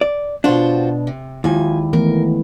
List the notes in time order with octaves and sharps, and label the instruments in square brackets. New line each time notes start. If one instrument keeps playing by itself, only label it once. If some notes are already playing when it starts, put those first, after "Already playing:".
[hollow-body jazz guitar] D5
[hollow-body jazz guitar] B2 D4 [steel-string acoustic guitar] F4 F#4 C5
[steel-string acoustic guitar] C3
[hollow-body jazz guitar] D#2 [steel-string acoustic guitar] F3 G#5 [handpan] G#3 E4
[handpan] E3 A3 B3 [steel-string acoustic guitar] A#4